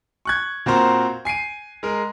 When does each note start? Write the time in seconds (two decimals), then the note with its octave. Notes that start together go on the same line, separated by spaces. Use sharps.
0.25 C#6 F#6 G#6
0.66 A#2 C4 F#4 A#4 C5 A#5
1.25 G#5 C7 D7 D#7
1.83 G#3 A#4